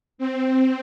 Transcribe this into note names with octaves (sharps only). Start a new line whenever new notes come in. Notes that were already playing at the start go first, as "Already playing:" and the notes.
C4